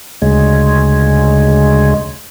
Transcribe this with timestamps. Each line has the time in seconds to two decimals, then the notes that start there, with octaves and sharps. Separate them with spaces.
0.22 D2 C#3 G#3